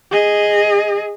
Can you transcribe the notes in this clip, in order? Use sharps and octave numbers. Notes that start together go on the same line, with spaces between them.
G#4 D#5